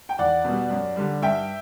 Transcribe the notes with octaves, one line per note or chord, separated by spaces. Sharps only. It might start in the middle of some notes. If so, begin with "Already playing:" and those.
G5
E2 D5 F#5
B2 G3
F#2
D3 G3
G2 E5 G5